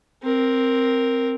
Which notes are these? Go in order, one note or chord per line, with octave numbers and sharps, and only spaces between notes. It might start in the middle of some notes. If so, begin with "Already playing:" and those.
C4 A#4